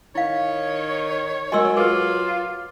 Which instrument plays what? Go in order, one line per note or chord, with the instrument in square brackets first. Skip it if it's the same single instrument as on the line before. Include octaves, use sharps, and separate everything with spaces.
[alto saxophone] D#3 [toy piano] E4 F5 [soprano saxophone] C#5
[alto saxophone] F#3 [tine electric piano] G#3 A#4 G#5 [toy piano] D#5 C6 E6
[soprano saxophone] F4 [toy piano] G#4 A#4 B4 [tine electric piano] D6 F6